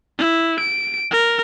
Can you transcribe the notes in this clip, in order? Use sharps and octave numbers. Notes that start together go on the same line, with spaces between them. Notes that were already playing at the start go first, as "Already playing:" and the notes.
E4
D7
A#4